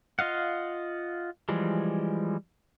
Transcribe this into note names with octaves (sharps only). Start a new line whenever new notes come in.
F4 D#5 F5 F#5
E3 F3 G3 G#3